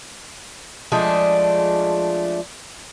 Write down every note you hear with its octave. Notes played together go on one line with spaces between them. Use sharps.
F3 G#3 A3 D4